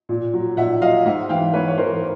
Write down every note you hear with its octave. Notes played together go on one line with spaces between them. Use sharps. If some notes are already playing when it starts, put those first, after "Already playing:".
A#2
F#3
A#2 E5 F#5
F#3 D#5 F5
G#2 E5 F#5
E3 F5 G5
G#2 B4 C#5
C#5
E3 A#4 C5
A#4